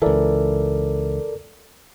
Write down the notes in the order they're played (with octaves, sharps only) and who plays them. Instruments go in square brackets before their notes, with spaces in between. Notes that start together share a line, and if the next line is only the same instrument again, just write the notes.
[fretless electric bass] C#2 E3 [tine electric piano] A4 A#4 D5